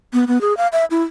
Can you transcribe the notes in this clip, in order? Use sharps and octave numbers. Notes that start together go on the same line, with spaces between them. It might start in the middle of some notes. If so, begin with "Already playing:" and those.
B3
B3
G#4
F5
E5
E4